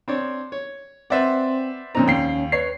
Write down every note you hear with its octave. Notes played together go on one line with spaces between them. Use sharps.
C4 D4 C#5
C#5
C4 B4 C5 D5 E5 F#5
F2 A#2 C4 C#4 D#4 A#5
D#2 G5 C7
B4 C#5 C7